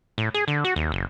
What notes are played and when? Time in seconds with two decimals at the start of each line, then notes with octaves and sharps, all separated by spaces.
0.18 A2
0.34 G#4
0.48 D3
0.65 F#4
0.76 D#2
0.92 F#1